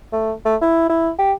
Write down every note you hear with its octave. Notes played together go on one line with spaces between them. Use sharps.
A3
A3
E4
E4
G4